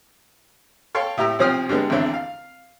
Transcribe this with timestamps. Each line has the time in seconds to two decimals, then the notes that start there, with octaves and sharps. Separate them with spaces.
0.95 A4 C#5 F5 G5 C6
1.17 A2 E4 G4 A#5 E6
1.39 B1 C3 F3 C4 D#6 F6
1.69 G2 D3 G#3 B3
1.90 G#1 E2 D3 C4 E4
2.14 F5